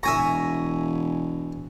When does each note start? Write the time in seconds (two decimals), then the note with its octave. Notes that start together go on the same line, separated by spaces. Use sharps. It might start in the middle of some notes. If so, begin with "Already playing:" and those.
0.03 E1 E5 G#5 A#5 C#6